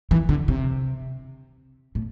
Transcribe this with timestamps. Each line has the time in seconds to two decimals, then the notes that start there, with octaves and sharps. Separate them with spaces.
0.11 E3
0.29 D3
0.48 C3
1.95 A2